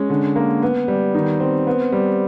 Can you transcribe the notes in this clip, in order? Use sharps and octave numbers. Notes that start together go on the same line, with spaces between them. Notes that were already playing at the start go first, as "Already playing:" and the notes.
Already playing: G#3 C#4
D3
A#3
B3
G3
D#3
C4
B3
G3